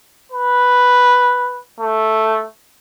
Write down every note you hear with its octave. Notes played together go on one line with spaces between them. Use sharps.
B4
A3